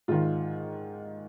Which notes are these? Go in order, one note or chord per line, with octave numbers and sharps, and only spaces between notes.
G#2 D#3 F4